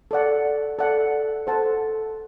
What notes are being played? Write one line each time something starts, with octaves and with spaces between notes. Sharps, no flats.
A4 D5 F#5
A4 D5 F#5
A4 C5 F#5 A5